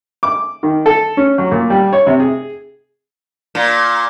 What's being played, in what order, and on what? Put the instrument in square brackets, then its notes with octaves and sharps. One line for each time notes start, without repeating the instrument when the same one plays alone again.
[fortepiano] D6
D#3
A4
C#4
F#3
A#2
G3
C#5
C3
G#4
[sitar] A#2